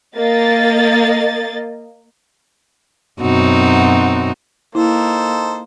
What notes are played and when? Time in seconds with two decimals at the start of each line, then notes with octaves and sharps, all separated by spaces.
0.17 A#3 D#5 A6
3.21 F#2 B2 C4 D#4 F#4
4.75 A#3 D#4 E4 A4 C5